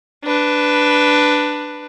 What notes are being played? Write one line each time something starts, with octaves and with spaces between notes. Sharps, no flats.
D4 B4